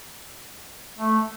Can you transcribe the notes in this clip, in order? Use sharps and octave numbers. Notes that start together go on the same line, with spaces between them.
A3